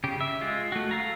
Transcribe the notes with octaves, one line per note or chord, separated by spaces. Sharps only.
C#3 G4
E5
G#3 F4
A3 F#4
A4 F5 A#5